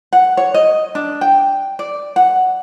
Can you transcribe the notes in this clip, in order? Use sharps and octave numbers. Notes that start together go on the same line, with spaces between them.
F#5
C#5
D#5
D4
G5
D5
F#5